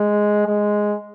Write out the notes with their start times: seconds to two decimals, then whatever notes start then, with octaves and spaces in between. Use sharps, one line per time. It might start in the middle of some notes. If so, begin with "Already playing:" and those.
Already playing: G#3
0.47 G#3